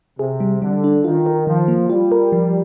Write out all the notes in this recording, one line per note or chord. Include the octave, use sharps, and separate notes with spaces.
C3 G#4
G3
D3 G3
D4
D#3 F4
A#4
D#3 F3
A#3
G3 F4
A#4
F3